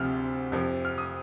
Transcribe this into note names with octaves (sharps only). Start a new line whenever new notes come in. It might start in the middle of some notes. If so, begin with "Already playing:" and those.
Already playing: D2 C3 F3 F6
F2 C3 F3
F6
D#6